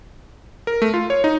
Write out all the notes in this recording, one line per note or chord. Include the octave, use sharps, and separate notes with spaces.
A#4
A3
F4
C#5
D#4